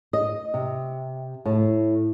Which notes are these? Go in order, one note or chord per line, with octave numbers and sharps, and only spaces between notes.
D#5
C3
A2